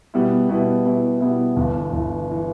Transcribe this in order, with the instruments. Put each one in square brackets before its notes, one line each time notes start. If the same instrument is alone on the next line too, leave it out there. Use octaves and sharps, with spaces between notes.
[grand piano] B2 G3 B3 E4
B2 G3 B3 E4
B2 G3 B3 E4
B2 G3 B3 E4
G1 G2 E3
G1 G2 E3
E3